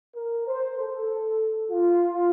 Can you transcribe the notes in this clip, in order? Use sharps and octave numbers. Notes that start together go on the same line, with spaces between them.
A#4
C5
A4
F4